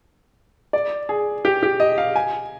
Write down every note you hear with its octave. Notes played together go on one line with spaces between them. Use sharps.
D5
G#4
G4
G4
D#5
F5
G#5